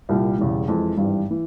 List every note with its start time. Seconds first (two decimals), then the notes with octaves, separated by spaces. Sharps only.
0.09 C2 A#2 G3
0.38 E1 E2 C#3 E3 G3
0.68 F2 E3 G#3
0.97 G#1 G2 E3 G3
1.31 E3